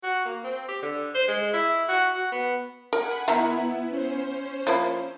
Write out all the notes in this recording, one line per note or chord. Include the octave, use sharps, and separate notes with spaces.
F#4
A#3
C4
G4
D3
C5
G#3
E4
F#4
F#4
B3
A#4 F#5 G#5 B5
D#3 B3 E4 E5 A#5
C#4 C5
F3 A#3 E4